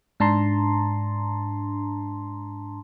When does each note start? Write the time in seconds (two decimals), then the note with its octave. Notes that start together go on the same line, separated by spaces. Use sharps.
0.20 G#2 D4 A5 A#5 C6